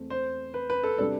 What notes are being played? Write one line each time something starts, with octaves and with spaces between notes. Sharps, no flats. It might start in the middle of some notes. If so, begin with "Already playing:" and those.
Already playing: E2 A3 C4
C5
B4
B4
A4
C3 G3 D4 A4